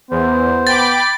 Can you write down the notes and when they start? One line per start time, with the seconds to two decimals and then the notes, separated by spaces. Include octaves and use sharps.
0.11 E2 B3 C5
0.67 G5 B5 D6 A6